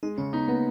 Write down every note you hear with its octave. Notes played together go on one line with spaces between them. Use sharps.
G#3 D#4
C#3 C#4
B3 D#4
A#3 B3